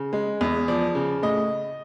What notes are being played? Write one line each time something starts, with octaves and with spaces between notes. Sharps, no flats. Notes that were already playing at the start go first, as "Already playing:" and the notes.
Already playing: C#3
G#3
E2
F3 D5
C#3
A2 D#5